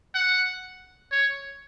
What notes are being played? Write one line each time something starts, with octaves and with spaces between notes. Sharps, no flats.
F#5
C#5